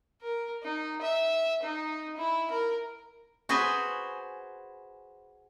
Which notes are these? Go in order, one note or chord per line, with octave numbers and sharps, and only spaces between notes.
A#4
D#4
E5
D#4
E4
A#4
F#4 G#4 B4 C5 G#5